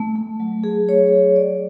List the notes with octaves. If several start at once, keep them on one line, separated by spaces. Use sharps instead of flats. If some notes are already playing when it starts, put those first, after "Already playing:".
Already playing: A3
A3
F#3
G#4
C#5
G#4
D5